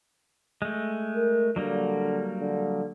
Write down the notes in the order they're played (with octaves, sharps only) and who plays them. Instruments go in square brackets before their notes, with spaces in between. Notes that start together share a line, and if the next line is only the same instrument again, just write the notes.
[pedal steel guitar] G#3 A3
[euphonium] A#4
[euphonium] D3 [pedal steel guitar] F#3 G3 A#3
[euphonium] D3